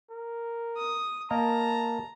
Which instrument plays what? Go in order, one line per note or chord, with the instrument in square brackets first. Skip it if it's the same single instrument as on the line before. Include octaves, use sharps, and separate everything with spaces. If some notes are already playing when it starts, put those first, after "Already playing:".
[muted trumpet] A#4
[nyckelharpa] D#6
[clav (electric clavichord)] A#3 A#4 D#5 [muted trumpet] A5 [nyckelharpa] A#5